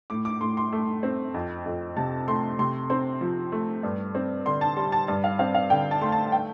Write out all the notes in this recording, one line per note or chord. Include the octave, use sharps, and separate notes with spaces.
A2 D6
D6
A2 C6
C6
A3
C4
F2
F2
C3 A5
A3 C6
C3 C6
C4 C6
F3
A3
G2
C4
D3 C6
A5
G3 C6
A5
G2 A5
F5
C4 F5
F5
D3 G5
A5
A3 C6
A5
G5